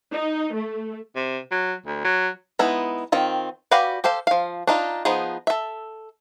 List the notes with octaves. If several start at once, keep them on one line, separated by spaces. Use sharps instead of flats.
D#4
A3
C3
F#3
D2
F#3
G#3 B3 D#4 E4
D#3 C4 F4
F#4 G4 B4 D5 F5
G4 A4 C5 F5
F3 F5
D4 D#4 F4
F3 B3 D#4 G#4
A4 E5